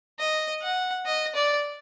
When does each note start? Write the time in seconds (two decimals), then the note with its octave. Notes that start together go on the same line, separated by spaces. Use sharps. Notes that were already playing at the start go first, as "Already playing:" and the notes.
0.19 D#5
0.62 F#5
1.06 D#5
1.35 D5